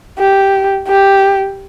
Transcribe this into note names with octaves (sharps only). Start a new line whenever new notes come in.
G4
G4